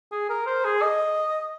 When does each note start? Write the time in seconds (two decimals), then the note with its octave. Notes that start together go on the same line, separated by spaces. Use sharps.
0.12 G#4
0.30 A#4
0.47 C5
0.64 G#4
0.82 D#5